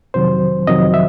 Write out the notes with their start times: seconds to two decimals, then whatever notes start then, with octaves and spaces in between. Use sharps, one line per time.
0.14 F2 C3 D#3 F#3 C5
0.67 F2 C3 D#3 F#3 D#5
0.94 E5